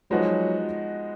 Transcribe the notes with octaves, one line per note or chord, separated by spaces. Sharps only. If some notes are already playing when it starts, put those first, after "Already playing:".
F3 F#3 G#3 B3 D#4 F#4